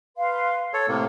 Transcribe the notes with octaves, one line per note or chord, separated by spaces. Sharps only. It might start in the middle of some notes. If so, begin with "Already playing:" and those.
B4 F5 C6
A4 C#5 E6
A2 C3 A#3